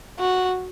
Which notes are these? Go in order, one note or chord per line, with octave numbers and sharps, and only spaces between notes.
F#4